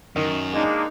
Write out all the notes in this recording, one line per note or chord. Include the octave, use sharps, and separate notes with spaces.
F#2 D#3
G#3 A#3 D4 D#4